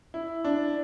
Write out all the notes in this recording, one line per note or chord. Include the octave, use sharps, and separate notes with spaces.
E4
D4